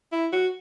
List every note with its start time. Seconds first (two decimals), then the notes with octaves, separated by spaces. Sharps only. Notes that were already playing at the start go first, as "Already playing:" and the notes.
0.12 E4
0.33 F#4